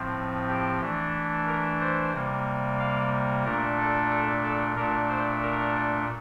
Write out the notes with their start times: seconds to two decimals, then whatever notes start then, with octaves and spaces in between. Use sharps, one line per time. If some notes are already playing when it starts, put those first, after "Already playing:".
Already playing: A2 F3 C4
0.48 G4
0.81 E3 A3 D4
1.47 A#4
1.80 C5
2.13 C3 G3 A#3
2.79 F5
3.44 A#2 A3 D4 A#4
3.78 A4
4.10 A4
4.43 A4
4.76 A#2 A3 D4 A#4
5.09 C5
5.42 A#4